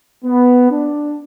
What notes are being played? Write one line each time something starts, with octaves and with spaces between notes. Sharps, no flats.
B3
D4